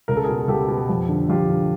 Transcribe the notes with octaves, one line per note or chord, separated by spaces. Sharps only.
C#2 A#4
A4
B2 G#4 A#4
C#2 G4 A4
B2
F2
D3
F2 F4 G4
D3